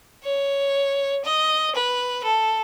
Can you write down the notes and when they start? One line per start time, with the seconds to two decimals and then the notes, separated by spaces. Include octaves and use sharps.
0.24 C#5
1.24 D#5
1.75 B4
2.24 A4